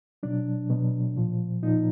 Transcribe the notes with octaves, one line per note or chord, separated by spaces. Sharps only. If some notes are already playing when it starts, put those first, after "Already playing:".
B2 F#3 D4
B2 F#3
A#2 F3
A#2 F3 D#4